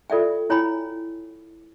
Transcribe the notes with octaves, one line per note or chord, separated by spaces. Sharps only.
F4 A4 D5 E5 G5
E4 C#5 G5 G#5 B5